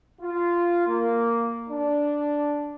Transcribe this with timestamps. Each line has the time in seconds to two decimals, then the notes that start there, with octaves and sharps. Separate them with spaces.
0.21 F4
0.87 A#3
1.70 D4